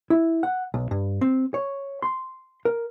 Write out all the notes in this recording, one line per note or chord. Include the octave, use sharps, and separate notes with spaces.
E4
F#5
B1
G2
C4
C#5
C6
A#4